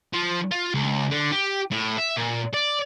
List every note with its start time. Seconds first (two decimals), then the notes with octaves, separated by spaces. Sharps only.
0.13 F3
0.51 F4
0.74 C#2
1.11 D3
1.32 G4
1.71 A2
1.98 E5
2.17 A#2
2.54 D5